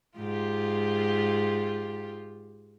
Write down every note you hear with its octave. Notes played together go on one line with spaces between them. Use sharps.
G#2 F4 G4